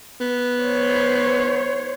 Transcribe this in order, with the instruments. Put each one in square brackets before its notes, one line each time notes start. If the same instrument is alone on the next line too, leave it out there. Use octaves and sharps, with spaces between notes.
[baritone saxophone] B3
[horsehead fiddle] C5 C#5